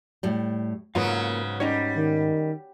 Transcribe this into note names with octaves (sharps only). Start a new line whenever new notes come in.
A2 G3
G#2 C#3 F#3 A#3 B3 F4 F5
G3 C#4 D#4 C#5
D#3